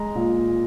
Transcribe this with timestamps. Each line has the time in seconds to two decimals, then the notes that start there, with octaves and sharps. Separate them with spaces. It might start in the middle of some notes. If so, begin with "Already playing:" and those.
Already playing: G#3 A#5
0.15 A#2